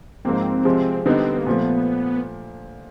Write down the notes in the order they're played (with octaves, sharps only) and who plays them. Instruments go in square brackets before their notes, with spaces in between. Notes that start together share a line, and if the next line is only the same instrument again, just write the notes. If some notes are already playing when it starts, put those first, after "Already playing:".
[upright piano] G#2 F3 A#3 [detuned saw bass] C4
[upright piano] C3 F3 G#3
[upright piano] D3 G3 B3 D#4 [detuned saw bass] C4
[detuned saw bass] A#3
[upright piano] A#2 F3 A3 [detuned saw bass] B3